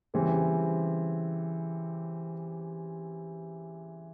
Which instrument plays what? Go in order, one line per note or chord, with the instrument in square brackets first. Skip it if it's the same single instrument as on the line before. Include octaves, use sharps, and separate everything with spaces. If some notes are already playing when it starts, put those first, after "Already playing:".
[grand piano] C#3 E3 G3 C4